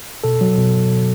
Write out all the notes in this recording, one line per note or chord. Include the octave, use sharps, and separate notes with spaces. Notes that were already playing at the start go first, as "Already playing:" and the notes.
B2 A4
F#3
B2